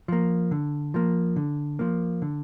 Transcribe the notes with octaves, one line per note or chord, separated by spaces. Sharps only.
F3 A#3
D3
F3 A#3
D3
F3 A#3
D3